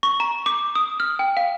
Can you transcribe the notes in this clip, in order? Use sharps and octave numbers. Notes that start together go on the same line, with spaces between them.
C#6
A#5
D6
D#6
F6
G5
F5